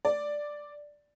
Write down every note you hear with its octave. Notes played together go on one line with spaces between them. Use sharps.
D5